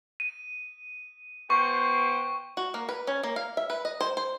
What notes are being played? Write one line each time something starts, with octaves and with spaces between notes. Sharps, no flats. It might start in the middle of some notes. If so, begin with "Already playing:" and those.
D#7
B2 C5 G5 C#6
F#4
A#3
B4
C#4
A#3
F5
E5
B4
D#5
C5
C5